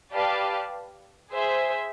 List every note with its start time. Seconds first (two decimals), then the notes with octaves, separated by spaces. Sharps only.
0.13 G4 B4 D5 F5 A5
1.32 G#4 C5 E5